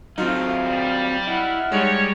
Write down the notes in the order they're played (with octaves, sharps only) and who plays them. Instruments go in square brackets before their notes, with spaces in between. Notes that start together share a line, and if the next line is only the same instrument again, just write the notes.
[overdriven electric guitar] F#3 C4 [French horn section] A3 [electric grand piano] D#4 F4 [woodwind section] F5
[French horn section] G3
[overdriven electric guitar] E4 [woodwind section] D#5 F#5 F6
[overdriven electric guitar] G3 [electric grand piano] G#3 D#4 [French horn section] C#5